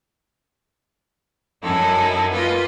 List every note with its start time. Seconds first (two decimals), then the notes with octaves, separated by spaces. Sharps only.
1.62 F#2 D#4 E4 A4 G#5
2.32 A#3 F4 B4 D#5